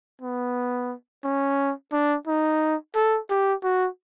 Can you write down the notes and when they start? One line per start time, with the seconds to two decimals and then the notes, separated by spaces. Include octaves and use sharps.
0.22 B3
1.24 C#4
1.92 D4
2.27 D#4
2.95 A4
3.30 G4
3.64 F#4